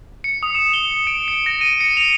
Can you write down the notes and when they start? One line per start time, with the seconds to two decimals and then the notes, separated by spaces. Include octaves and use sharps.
0.24 C#7
0.43 D#6
0.55 E7
0.73 G7
1.07 D7
1.28 C#7
1.46 A#6
1.61 D#7
1.80 C#7
1.97 F7